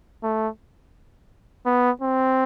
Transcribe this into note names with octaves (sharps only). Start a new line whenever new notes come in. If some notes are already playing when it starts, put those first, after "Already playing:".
A3
B3
C4